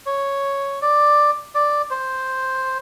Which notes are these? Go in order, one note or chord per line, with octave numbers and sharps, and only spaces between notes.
C#5
D5
D5
C5